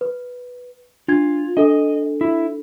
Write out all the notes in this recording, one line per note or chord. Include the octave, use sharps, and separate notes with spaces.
B4
D4 F4 G#6
D4 A4 D#5
E4